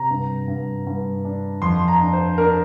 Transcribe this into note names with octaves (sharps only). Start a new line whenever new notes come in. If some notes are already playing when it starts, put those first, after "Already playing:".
Already playing: C3 A#5
G2
G2
G2
D4
F2 C6
A#5
D4
C5
D4 A#4